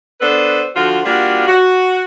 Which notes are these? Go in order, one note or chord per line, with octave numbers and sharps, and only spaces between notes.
B3 D4 A4 B4 C5
D3 F3 F4 F#4
G3 A#3 D4 F4 F#4
F#4